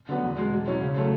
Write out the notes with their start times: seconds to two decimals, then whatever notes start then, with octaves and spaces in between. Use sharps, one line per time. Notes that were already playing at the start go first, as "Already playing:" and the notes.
0.09 D3 F#3 B3 F#4
0.23 E2
0.38 B2 G#3
0.53 B2
0.67 F#3 C#4 E4
0.81 C#3
0.96 F#3 A3 C#4